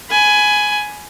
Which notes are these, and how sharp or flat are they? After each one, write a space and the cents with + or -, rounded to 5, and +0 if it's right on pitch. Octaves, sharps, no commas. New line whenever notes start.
G#5 +10 B5 +15